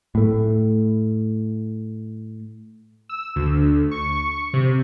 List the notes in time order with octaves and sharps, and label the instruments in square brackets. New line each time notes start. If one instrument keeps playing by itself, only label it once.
[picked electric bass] A2 A3
[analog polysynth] E6
D2
C#6
C3